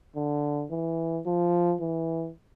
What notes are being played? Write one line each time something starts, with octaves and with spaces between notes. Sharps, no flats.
D3
E3
F3
E3